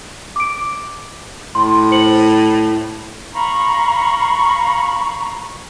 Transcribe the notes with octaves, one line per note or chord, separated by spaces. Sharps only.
D6 D7
A2 C6
C5 C#7 F#7
F5 A#5 B5 C#6